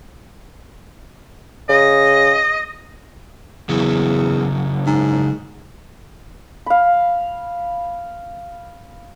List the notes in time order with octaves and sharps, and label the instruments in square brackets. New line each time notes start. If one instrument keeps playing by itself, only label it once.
[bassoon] C#3 [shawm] D#5
[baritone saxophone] E2 [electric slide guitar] C#3 F#3 E4
[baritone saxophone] G#2
[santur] F5 B5